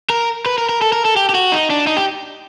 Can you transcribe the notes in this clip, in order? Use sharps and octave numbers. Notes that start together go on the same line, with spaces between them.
A#4
B4
A#4
A#4
A4
A#4
A4
G4
G4
F#4
D#4
D4
D#4
G4